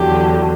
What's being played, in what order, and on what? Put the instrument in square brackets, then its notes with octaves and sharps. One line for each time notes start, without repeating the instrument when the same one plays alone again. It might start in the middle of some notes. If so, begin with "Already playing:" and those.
Already playing: [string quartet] E2 D3 F#3 G4